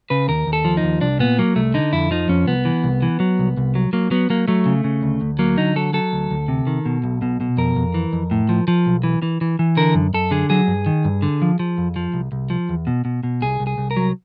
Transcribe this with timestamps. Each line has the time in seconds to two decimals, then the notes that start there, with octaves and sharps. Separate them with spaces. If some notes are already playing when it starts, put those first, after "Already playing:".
0.10 C#3 B4
0.28 D#2 A#4
0.47 D#2
0.53 A4
0.65 F3
0.77 D#4
0.84 D#2
1.01 C2 D4
1.19 A#2 B3
1.39 F#3 A#3
1.56 C2 A3
1.74 D3 D#4
1.93 F2 E4
2.11 F3 D#4
2.29 F2 C#4
2.47 C2 B3
2.65 E3
2.84 C2
3.02 E3
3.20 F#3
3.39 C2
3.57 C2
3.75 F#3
3.93 F#3 A#3
4.11 F#3 B3
4.30 F#3 A#3
4.48 F#3 A3
4.66 C#3
4.84 C#3
5.03 D2
5.21 D2
5.39 F#3 A#3
5.57 D3 D#4
5.76 F#3 A4
5.93 F#3 A4
6.13 D2
6.31 D2
6.48 C3
6.67 D#3
6.86 B2
7.04 B1
7.22 B2
7.41 B2
7.57 F2 A#4
7.76 F2
7.94 E3
8.13 F2
8.31 A2
8.49 F3
8.68 F3
8.86 B1
9.04 E3
9.22 E3
9.41 E3
9.59 E3
9.77 D3 A#4
9.95 F#2
10.14 F#2 A4
10.31 D3 G#4
10.50 F#3 G#4
10.68 G2
10.86 D#3
11.05 G2
11.22 D3
11.42 F3
11.59 F3
11.78 F2
11.96 F3
12.14 C2
12.32 C2
12.50 F3
12.69 E2
12.87 B2
13.05 B2
13.23 B2
13.42 C2 G#4
13.60 C2
13.67 G#4
13.78 C2
13.91 A#4
13.97 F#3